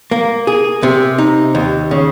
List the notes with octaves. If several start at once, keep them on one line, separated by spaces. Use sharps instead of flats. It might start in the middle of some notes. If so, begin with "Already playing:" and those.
A#3
G#4
C3
D#4
D#2
C#3